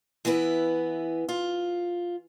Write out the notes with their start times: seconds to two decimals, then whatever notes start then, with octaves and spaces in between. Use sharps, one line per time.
0.25 E3 B3 E4 B4
1.29 F4